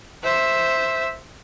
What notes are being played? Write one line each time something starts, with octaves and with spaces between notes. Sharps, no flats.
C5 E5